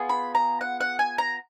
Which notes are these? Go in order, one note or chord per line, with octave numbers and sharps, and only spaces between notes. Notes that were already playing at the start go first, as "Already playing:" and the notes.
Already playing: B3 F4 G#4
B5
A#5
F#5
F#5
G#5
A#5